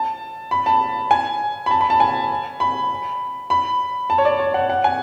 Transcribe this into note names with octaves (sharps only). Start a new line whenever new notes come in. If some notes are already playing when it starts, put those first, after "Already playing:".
Already playing: A5
B5
A5
G#5
B5
A5
B5
A5
G#5
B5
B5
A5
C#5
D5
C#5
F#5
F#5
G#5